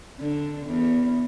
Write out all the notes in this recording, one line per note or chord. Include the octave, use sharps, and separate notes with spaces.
D3
E2